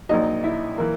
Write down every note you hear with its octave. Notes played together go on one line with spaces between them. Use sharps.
A#1 A#2 F#3 D#4 D#5
E4 E5
E3 A#3